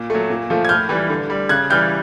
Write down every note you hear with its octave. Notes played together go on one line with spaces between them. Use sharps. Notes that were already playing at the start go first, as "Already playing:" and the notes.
Already playing: A#2
F#3 A3
A#2
F3 A3
G#6
A2 F6 G6
E3 G3
D3
G3
C#3 F#6 G#6
E3 G3 F6 G6